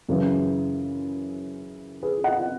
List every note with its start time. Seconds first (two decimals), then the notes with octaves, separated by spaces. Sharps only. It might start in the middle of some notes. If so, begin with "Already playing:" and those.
0.09 F#2 C#3 E3
2.03 G#4 B4
2.24 D#5 F#5